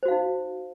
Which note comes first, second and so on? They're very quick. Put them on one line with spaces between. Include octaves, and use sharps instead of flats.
C5 F#4 F5 D#4